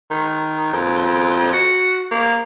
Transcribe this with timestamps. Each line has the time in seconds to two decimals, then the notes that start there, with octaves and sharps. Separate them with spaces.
0.10 D#3
0.73 F2
1.53 F#4
2.11 A#3